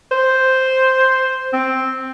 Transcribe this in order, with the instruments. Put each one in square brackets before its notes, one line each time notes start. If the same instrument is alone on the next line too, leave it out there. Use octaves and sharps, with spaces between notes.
[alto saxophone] C5
C4